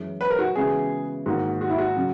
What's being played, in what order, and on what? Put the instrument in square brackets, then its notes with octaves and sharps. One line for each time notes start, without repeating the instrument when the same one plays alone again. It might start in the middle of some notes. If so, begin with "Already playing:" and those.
Already playing: [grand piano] F#2 E3 G#3 C#4
[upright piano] B4
A#4
F#4
[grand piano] C#3 E3 G#3 B3 F#4 [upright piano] G#4
[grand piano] G#2 D#3 A#3 D#4 [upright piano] F#4
[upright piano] F#4
E4
F#4
[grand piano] C#3 F#3